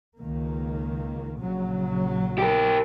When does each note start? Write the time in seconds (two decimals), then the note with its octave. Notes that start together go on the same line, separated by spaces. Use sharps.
0.18 C#2 D#3 A#3
1.40 A#1 C#3 F#3
2.38 G4 A#4